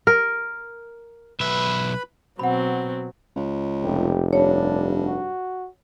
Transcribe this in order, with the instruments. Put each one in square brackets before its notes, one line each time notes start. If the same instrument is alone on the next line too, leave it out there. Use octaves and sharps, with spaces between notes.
[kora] A#4
[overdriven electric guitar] B1 E5 [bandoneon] B4 B5
[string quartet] B2 F#3 C4 [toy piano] F#5 B5
[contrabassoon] C#2
[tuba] F1 [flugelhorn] G4
[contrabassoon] G2 [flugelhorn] D4 [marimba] C#5
[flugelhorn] F#4